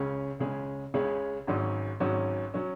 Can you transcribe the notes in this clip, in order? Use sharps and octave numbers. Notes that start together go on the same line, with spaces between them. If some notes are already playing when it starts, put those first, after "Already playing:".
Already playing: C#2 C#3 G#3 C#4 G#4
C#2 C#3 G#3 C#4 G#4
C#2 C#3 G#3 C#4 G#4
G#1 G#2 F#3 C#4
G#1 G#2 F#3 C#4
F#3 C#4